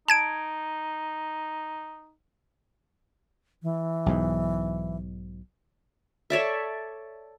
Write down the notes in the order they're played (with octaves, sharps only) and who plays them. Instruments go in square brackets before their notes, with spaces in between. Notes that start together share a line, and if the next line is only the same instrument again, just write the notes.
[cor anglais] D#4 [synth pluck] A5 G#6 D7
[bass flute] E3
[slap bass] B1 G#2
[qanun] A4 C#5 D5 E5